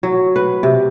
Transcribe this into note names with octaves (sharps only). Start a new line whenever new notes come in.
F#3
B4
C3